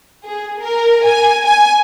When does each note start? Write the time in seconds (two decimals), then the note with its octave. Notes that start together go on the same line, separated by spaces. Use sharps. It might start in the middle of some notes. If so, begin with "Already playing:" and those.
0.25 G#4
0.61 A#4
1.05 G#5
1.45 G#5